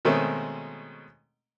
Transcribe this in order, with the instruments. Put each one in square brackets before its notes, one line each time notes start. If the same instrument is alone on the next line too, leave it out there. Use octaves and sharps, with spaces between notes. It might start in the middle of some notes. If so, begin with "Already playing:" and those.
[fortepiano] B2 D#3 G#3 A3 C4 C#4